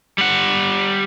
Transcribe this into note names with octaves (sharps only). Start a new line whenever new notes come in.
G3 F#5